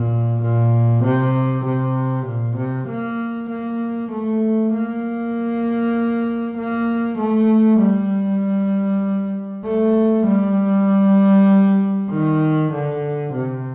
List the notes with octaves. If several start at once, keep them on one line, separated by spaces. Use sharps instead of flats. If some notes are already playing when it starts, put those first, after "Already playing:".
Already playing: A#2
A#2
C3
C3
A#2
C3
A#3
A#3
A3
A#3
A#3
A3
G3
A3
G3
D#3
D3
C3